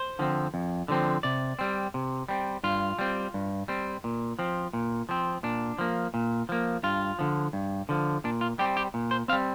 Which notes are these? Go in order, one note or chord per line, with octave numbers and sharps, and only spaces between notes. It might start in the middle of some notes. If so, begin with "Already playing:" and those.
Already playing: C5
D3 F3 C4
F2
D3 F3 C4
C3 D5
G3 C4
C3
G3 C4
G2 F4
G3 C4
G2
G3 C4
A#2
F3 C4
A#2
F3 C4
A#2 D4
F3 A#3
A#2
F3 A#3
G2 F4
D3 F3
G2
D3 F3
A#2 D4
F4
G3 C4 G4
G4
A#2
C5
G3 C4 F5